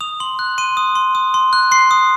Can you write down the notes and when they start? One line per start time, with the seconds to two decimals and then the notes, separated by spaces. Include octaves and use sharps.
0.01 D#6 F7
0.20 C6 F#7
0.39 F#6
0.58 C6 D#7
0.77 D#6
0.95 C6
1.15 D#6
1.34 C6
1.53 F#6
1.71 C6 C7
1.91 D#6